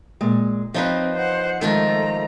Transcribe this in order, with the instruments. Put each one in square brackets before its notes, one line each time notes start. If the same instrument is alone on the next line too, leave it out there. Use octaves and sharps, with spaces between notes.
[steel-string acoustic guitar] A#2 G#3
[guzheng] F3 D#4 B4 [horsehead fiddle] C4 [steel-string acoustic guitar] C#5 D#5 F5
[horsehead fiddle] C5 F#5
[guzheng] D#3 F3 F4 [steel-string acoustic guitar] G#3 [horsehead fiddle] A3 A#5